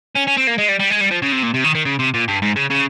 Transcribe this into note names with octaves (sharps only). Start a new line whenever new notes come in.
C#4
C#4
C4
A#3
G#3
G3
G3
G#3
G3
F3
C#3
C3
A#2
C3
D#3
D#3
C#3
C3
A#2
G2
G#2
C#3
C#3